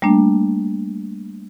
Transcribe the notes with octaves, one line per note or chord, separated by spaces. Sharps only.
G3 A3 A#3 D4